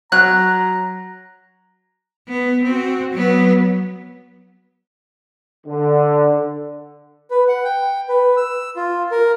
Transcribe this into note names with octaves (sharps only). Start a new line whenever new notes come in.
F#3 A#5 F#6
B3
C4 F#4
F#3 B3
D3
B4
F#5
G5
B4
E6
F4
A#4